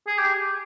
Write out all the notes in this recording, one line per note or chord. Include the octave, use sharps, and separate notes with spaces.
G#4
G4